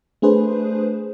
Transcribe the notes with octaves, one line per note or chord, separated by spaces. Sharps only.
A3 D4 G#4 B4 C5